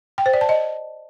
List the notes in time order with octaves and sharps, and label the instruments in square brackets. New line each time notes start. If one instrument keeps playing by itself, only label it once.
[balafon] G5
C5
D5
A5
D#5